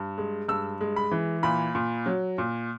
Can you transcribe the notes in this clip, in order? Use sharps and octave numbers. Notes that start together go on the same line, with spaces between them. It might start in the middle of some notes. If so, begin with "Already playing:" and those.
Already playing: G2
G#3
G2 E6
G#3
B5
E3
A#2 B5
A#2
F#3
A#2